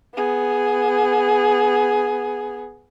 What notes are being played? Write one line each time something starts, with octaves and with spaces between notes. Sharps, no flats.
B3 G#4